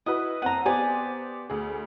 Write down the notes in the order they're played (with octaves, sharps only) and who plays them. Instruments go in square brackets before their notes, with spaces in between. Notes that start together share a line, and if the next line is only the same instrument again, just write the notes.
[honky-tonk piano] E4 F#4 B4 [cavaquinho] D#5
[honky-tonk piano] F#1 C4 D#7 [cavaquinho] F#5 A#5
[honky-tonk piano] B3 G4 C5 [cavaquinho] D5 G#5
[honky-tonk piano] D2 G#4